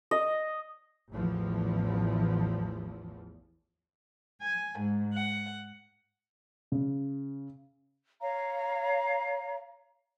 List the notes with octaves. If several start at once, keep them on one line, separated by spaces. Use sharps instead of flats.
D#5
A1 E2 E3 F3
G#5
G#2
F#5
C#3
C#5 F5 A#5